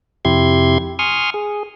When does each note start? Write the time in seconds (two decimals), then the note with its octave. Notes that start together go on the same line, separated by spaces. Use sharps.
0.25 F2 C3 E4 G4 C6 G#6
0.99 G#5 C6 C#6 D#6 F6
1.34 G#4